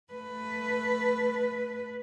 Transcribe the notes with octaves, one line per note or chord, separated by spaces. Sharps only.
A3 B4